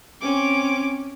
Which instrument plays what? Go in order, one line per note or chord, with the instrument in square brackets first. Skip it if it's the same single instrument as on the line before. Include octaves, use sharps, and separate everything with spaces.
[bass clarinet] C4 [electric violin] C#4 D6